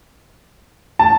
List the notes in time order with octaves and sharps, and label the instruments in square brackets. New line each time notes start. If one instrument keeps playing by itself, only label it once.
[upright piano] A5